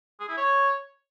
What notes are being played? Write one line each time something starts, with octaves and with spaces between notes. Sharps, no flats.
G#4
E4
C#5